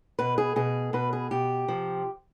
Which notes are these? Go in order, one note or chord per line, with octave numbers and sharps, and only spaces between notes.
B2 B4
G#4
B2 G#4
B2 B4
G#4
B2 G4
C3 F3